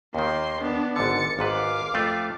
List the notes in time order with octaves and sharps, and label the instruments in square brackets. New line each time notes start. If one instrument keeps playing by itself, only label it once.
[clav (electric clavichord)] D#2 D#3 [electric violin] A#3 C6
[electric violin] B3 D4
[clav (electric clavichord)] G#1 G#2 D3 [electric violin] A6 C#7
[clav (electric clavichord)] G#1 G#2 B4 [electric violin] F5 D6
[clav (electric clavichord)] F2 A3 F4